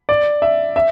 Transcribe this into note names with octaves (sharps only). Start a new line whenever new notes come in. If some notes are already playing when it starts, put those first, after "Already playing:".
D5
E5
E5